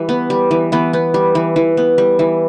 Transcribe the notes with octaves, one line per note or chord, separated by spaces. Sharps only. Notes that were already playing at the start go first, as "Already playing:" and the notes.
Already playing: E3 G3
B3
G3
E3
E3 B3
B3
G3
E3
E3
B3
G3
E3